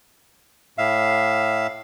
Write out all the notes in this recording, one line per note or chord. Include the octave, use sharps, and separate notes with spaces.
A2 E5 F5